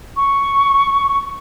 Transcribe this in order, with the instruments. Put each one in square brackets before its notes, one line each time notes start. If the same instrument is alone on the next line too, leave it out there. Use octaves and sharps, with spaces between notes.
[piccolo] C#6